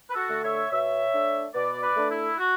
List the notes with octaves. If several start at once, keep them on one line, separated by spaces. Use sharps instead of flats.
B4
F#4 A4
D3 A3
C#5 E5
B2 C#5 E5
A3 D4
B2 B4 D5
B4 D5
A3 D4
E4
F#4